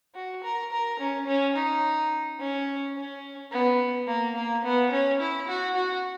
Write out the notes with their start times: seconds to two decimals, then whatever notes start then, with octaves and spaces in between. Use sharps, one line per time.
0.15 F#4
0.44 A#4
0.72 A#4
1.00 C#4
1.27 C#4
1.55 D#4
2.39 C#4
2.96 C#4
3.51 B3
4.07 A#3
4.36 A#3
4.64 B3
4.91 C#4
5.20 E4
5.48 F#4
5.76 F#4